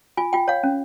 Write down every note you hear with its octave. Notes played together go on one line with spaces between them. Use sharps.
F4 G#5
F4 G5
C#5 F5
C#4